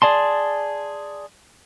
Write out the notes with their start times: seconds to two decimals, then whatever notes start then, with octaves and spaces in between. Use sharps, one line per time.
0.02 G#4 D5 A5 C6